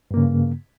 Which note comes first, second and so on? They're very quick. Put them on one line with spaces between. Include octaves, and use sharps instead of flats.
G2 A#3 C#3